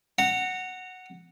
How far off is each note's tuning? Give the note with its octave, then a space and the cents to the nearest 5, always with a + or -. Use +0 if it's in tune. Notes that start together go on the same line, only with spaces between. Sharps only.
F#5 +0 A#5 -25